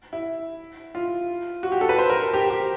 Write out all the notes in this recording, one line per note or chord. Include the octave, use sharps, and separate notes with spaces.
E4
F4
F#4
G4
A4
B4
C5
A#4
G4
G4